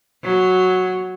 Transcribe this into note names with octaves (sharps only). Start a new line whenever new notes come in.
F#3